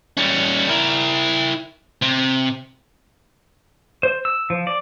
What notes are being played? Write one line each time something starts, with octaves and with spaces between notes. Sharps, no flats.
G3 C#4
E4 A#4
C3
C5
E6
F3
D5